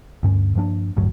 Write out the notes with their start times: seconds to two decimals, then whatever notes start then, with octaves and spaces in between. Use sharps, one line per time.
0.23 D2 G2 C#4
0.55 G2 F3 A#3 D4
0.97 A1 D2 G2 F#3